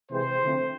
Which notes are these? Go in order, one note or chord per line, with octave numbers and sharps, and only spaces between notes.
C3 E3 G#3 C4 C5
D3 F3 A3 C4